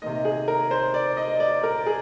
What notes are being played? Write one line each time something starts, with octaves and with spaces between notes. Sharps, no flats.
C3 D#3 A#3 D#5
G#4
A#4
C5
D5
D#5
D5
A#4
G#4